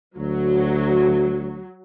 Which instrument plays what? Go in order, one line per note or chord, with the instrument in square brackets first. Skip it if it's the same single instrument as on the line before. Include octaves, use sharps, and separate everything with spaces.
[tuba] D2 [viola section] F#3